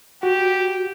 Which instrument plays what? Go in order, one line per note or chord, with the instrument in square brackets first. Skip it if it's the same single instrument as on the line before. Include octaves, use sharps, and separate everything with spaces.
[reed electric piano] F#4 [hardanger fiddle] G4